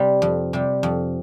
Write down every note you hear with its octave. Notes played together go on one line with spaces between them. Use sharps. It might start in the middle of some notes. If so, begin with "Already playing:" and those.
Already playing: C3 G3
F2
C3 G3
F2